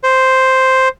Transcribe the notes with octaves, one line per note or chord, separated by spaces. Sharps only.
C5